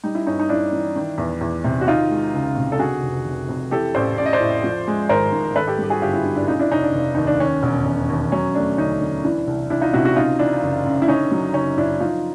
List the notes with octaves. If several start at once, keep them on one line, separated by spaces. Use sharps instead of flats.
G3 D#4
E4
G2 C#4 D#4
D#4
G2 D4 E4
E3
D#3
E2
E2
C3
F#4
D#3 D#4 F4
G#3
C#2
C3
A4
D3 F#4 G#4
F1
F1
F2
E3 G4 A4
A1 C5 D5
A1 D5
D#5
C5 D5
A2
F3
G#3
G#1 A#4 C5
G#2
D#3 A4 B4
G4 A4
G3
G4
F#4 G#4
G1 F4 G4
E4 F#4
G2
D4 E4
C#3 D#4 F4
D4 E4
F1 C#4 D#4
D4
F1
D#2 D#4
D4
D#3 C#4
E1
E1
D#2
F#3 C#4
A3 D4
D2 C#4 D#4
D3
E3 D4 E4
C2
C2 D4 E4
D#4 F4
C3 E4 F#4
E4 F#4
C#3 D#4 F4
E3 D4 E4
F#1
F#2
E4
D3 C#4 D#4
F#3
F#1 C#4 D#4
F#2 D4 E4
F3 D#4 F4